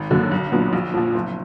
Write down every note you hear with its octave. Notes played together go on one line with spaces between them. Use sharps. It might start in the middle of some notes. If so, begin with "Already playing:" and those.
Already playing: G#1
F#2 D3 F#3 A#3
B1
A#2 F#3 B3 D4
A#1
A#2 F3
F#1